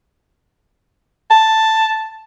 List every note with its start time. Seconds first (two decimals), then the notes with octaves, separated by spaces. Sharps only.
1.31 A5